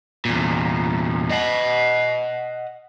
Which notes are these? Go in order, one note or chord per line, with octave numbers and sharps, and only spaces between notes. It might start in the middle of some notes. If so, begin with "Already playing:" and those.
E2 A#2
D#5 F#5